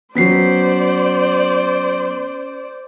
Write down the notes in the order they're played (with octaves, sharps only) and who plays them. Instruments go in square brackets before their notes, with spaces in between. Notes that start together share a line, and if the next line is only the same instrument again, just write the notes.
[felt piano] F#3 B3 [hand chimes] C#4 B6 C7 [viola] C5 D5